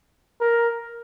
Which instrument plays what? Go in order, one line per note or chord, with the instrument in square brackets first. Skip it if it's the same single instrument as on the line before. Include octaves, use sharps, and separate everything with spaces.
[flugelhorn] A#4